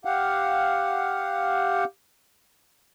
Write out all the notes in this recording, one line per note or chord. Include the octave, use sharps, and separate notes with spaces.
G4 F5 F#5